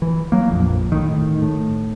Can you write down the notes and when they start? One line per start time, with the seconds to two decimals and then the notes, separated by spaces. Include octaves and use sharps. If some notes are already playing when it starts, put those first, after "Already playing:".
0.02 E3
0.32 F#3 A#3
0.51 A#1 F2
0.92 A2 D#3
1.42 A2